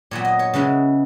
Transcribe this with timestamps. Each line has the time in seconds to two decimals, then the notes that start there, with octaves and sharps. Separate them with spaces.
0.11 A#2 F#3 B3 C#5
0.25 D#5
0.39 C#5
0.54 C#3 G#3 B3 E4 B4